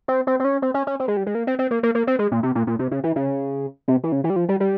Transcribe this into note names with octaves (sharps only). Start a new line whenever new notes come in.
C4
C4
C4
C#4
C4
C#4
C#4
C4
G#3
G3
G#3
A#3
C4
C4
A#3
A#3
A#3
C4
G#3
A#2
C3
A#2
A#2
C3
C#3
E3
C#3
C3
E3
C#3
E3
G3
F3
G3
G3